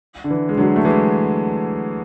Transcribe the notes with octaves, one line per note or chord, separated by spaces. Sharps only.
D3
E3
G#3
D3 F#3
A3
E3 G#3